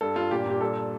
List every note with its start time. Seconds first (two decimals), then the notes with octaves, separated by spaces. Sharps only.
0.01 G2 A4
0.16 G2 F4
0.31 A#2 G4
0.46 A#2 G4
0.61 G2 A4